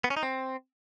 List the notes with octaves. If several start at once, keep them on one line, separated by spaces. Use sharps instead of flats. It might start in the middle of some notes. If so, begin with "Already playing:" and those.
B3
C#4
D#4
C4